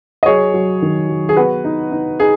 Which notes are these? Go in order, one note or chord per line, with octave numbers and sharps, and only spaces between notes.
D#5
F#3 G#4 C#5
F#3
D#3
F#3
G#4
B3 F#4 B4
D#4
D#4
D#4 G#4